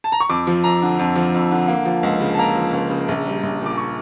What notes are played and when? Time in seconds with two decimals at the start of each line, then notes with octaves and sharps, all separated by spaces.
0.04 A5
0.12 A#5
0.20 C#6
0.30 F2 D6
0.47 F3
0.64 F2 A#5
0.82 D3
0.99 F2
1.16 F3
1.34 F2
1.51 D3
1.68 A#3
1.85 F3
2.03 C#2
2.20 C#3
2.34 A5
2.39 A#3 A#5
2.56 F3
2.73 C#2
2.90 C#3
3.08 A#1
3.25 G3
3.43 A#1
3.61 A#2
3.66 D6
3.77 C#6